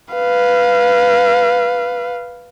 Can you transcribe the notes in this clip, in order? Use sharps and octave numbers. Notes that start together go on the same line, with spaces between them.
B4 F5